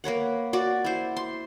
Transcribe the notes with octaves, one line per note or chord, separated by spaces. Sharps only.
A#3 B4 C#5 F#5
F#4 D5
E4 C5
C6